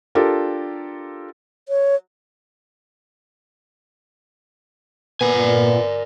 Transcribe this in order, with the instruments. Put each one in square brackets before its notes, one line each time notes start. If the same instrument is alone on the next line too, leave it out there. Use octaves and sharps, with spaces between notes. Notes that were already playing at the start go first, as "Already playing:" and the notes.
[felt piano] D4 F4 G4 A4 A#4
[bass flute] C#5
[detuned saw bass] A#2 [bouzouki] D3 [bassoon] B3 [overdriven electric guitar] A#4 G#5